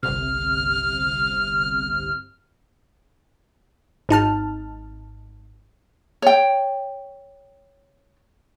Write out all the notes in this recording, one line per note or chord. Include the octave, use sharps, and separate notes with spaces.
G1 C2 C3 F6
G#1 D#4 A5 F6
C#5 G5